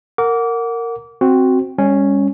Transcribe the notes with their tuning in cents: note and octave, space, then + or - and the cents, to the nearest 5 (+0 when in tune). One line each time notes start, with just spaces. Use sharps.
A#4 -15 F#5 -15 D6 -25
C4 +0 F#4 +0
G3 +40 C#4 +0